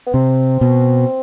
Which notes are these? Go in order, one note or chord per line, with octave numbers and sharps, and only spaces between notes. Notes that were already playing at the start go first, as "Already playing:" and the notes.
B3
C3 C4
B2